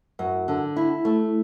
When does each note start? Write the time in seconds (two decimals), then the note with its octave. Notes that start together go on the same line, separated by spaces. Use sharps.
0.19 F#2
0.48 D3
0.76 E4
1.05 A3